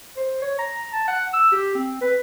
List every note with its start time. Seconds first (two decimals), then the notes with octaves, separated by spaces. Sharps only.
0.17 C5
0.42 C#5
0.59 A#5
0.93 A5
1.08 F#5
1.34 E6
1.52 G4
1.75 C4
2.01 B4